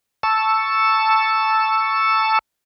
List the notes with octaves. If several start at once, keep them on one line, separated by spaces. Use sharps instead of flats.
A5 C#6 E6